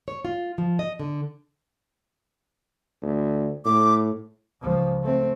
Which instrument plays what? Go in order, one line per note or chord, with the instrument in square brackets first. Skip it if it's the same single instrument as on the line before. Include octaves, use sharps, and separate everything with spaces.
[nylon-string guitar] C#5
F4
F3
D#5
D3
[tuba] D2
[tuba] A2 [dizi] D6
[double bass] C#2 F3
A3 C4